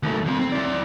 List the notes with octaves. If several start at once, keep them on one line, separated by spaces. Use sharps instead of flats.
D#2 A3
F3 C4
C4
E4 D5